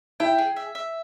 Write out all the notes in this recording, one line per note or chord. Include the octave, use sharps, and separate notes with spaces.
E4 G5
G#4
E5
E5